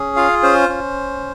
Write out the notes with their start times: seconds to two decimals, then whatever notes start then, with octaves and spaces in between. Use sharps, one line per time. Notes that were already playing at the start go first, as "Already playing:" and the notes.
Already playing: C#4 G#4
0.16 F4 F5
0.43 C#4 C5
0.69 C#4